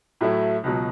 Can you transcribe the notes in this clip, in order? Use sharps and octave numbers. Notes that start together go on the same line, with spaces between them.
A2 F#3 A3 E4
C#2 B2 F#3